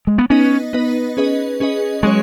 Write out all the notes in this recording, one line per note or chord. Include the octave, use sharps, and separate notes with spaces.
G#3
B3
B3 C#4 D#4 B4 D#5
B3 D#4 B4 D#5
C#4 G#4 B4 D#5
C#4 G#4 B4 D#5
F#3 G#3 C#4 G#4 C#5